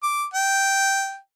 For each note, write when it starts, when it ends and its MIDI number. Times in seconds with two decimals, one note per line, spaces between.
0.03 0.25 86
0.34 1.17 79